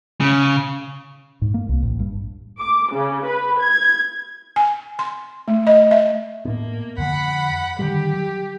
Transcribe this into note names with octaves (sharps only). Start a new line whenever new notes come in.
C#3
G#2
A#3
C2
A1
G2
D6
C#3
B4
G#6
G#5
C6
A3
D#5
E5
A2 A#3 B3
F2 D3 F3 F#5 B5
D3 D#3 G3 G4
F#3